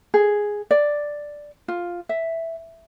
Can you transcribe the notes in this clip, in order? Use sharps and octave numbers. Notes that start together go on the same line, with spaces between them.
G#4
D5
F4
E5